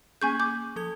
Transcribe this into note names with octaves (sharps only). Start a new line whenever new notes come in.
A#3 C#4 G#4 G#5 C#6 G6
D6 G6
F3 A4 G#6